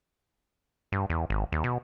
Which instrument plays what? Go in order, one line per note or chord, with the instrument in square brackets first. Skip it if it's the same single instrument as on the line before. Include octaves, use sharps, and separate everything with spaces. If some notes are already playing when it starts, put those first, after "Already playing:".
[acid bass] G2
E2
G#1
D#2
B2